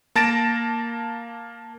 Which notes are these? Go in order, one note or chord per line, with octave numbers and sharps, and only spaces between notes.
A#3 A5 A6 A#6 D7 E7